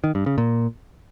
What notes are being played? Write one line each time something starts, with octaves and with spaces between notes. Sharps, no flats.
D#3
G2
C#3
A#2